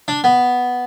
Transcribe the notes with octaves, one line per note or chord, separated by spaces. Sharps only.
D4
B3